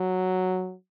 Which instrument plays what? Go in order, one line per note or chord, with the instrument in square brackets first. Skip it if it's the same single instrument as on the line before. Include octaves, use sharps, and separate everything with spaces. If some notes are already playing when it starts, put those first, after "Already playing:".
Already playing: [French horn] F#3